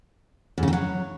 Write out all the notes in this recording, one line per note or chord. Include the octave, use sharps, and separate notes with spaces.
E2
C#3
D#3
F#3